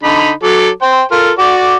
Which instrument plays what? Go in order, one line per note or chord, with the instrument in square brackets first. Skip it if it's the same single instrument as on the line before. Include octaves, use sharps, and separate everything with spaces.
[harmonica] D3 D#4 B5
F#3 A4 D6
C5 G5
F4 A4 A#4
F#4 D5 D6